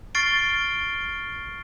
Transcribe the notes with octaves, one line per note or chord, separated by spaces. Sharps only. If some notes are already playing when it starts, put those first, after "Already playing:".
C#6 F6 A6 C7 D7 G7